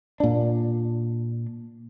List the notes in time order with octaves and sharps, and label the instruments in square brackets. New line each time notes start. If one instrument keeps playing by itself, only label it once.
[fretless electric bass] A#2 D4